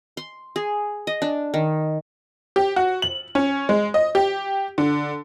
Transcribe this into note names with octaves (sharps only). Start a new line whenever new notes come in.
C6
G#4
D#5
D4
D#3
G4
F#4
F#7
C#4
G#3
D#5
G4
D3